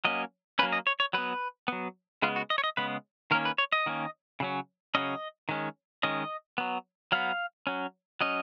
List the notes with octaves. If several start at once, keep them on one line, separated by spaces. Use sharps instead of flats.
F#3 A#3 C#4 D#5
F#3 A#3 C#4 B4
D#5
C#5
C#5
F#3 B3 B4
F#3 B3
C#3 G#3 B3 F4
F#4
D#5
C#5
D#5
C#3 G#3 B3 B4
D#3 A#3 C#4 A#4
B4
C#5
D#5
D#3 A#3 C#4
C#3 F#3 C#4
C#3 F#3 C#4 D#5
D#3 G#3 C#4
D#3 G#3 C#4 D#5
F#3 B3
F#3 B3 F5
F#3 C#4
F#3 C#4 D#5